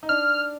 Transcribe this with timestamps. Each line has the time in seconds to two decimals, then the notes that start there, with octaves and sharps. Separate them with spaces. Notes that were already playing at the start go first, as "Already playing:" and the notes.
0.03 D#4
0.09 D4 F6